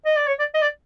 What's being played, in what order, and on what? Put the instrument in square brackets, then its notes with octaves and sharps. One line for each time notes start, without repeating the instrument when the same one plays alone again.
[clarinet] D#5
D5
C#5
D5
D#5
D5